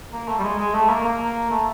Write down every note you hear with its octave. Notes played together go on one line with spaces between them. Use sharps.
A#3
A3
G3
G#3
G#3
A3
A#3
A#3
A3